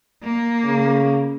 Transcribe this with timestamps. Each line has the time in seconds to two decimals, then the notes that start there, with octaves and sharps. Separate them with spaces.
0.23 A#3
0.64 C#3